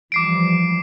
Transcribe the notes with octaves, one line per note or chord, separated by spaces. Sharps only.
E3 F3 G3 D6 C7 D7